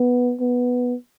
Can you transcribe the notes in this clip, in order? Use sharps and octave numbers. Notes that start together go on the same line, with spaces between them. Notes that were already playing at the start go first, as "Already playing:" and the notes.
Already playing: B3
B3